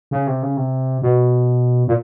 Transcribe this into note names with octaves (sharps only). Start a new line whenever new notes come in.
C#3
C3
C#3
C3
B2
A#2